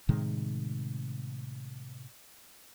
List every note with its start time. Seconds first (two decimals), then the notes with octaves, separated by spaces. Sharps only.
0.09 A2 C3 D#3 G#3